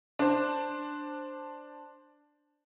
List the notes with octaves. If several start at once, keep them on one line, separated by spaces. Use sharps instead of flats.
D4 C5